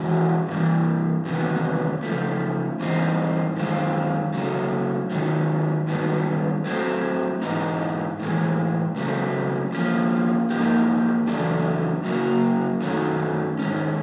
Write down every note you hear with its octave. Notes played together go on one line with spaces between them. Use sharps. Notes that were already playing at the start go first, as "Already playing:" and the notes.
Already playing: E3 G#3 C#4 F#4
G2 E3 G3
E2 C3 D#3 F#3 B3
C#3 F3 A3
G#2 E3 G3 C4 D#4
F#2 D#3 G#3 C4 F4
C#3 F#3 A3 C#4
G#2 D#3 F#3
G2 D#3 F#3 B3
F#3 A3 C4
G#2 E3 G#3 B3 D#4
A2 E3 G#3
C#3 F#3 A3 C4
F3 A#3 C#4 F4
G#2 F3 A#3 D#4 G4
E2 C#3 F#3 A3 D4
C#3 F#3 A#3
F#2 D#3 F#3 A3 C#4
G#2 D#3 G#3 C#4